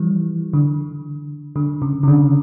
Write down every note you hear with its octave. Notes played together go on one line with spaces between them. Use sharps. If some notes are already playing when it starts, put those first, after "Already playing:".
Already playing: E3 F3 G3
D3
D3
C#3
C#3
D3